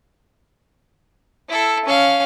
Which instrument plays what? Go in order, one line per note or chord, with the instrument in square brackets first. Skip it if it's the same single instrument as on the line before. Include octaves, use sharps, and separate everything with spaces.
[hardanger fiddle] E4 A4
C#4 F5